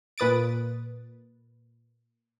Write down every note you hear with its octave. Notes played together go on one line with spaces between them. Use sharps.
A#2 B4 D#6 A6 D7